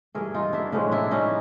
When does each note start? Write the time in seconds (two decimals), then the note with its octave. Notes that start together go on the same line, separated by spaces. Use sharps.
0.15 G2 E3 A3 G#4 A#4
0.34 D#4 F4
0.53 D4 E4
0.72 A2 F3 G#3 C#4 D#4
0.92 D4 E4
1.11 C#4 D#4